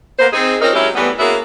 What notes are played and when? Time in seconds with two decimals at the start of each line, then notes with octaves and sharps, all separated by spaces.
0.19 A#3 B3 C5
0.33 C4 D#4 G#4
0.61 F3 C4 C#4 D#4 A#4
0.74 F#3 G#3 C#4 E4 G4
0.95 A2 E3 G3 B3
1.19 A#3 B3 C#4 E4 F#4 G#4